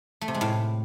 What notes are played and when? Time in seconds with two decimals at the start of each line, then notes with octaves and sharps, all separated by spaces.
0.21 A3
0.28 C3
0.34 G#3
0.41 A2